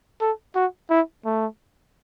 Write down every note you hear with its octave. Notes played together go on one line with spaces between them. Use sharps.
A4
F#4
E4
A3